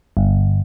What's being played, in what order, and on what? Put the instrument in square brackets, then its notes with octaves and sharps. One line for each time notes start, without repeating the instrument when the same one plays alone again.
[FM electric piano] G1